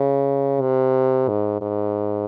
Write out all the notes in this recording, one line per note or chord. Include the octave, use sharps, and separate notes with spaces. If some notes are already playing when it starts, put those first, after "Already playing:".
Already playing: C#3
C3
G#2
G#2